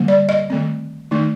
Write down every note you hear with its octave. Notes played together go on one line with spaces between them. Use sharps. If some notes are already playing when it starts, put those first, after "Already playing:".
Already playing: D3 G3 A#3
D5
D#5
D#3 A3 C4
D#3 A3 D#4